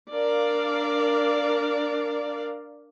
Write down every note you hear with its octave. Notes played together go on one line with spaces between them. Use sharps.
D4 A#4 D5 F5